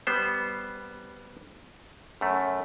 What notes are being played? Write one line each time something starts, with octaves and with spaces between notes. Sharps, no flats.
G3 B3 C5
F#2 A3